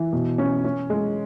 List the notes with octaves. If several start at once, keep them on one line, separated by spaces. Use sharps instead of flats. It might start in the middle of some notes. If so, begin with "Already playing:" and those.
Already playing: E3
B2
C#4
C#4
G#3